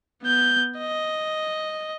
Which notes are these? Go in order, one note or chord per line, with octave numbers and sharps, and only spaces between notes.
B3 G6
D#5